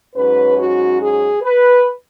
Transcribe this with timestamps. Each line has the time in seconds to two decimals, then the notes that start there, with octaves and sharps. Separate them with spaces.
0.15 G#2 F#3 C#4 B4
0.57 F#4
1.00 G#4
1.42 B4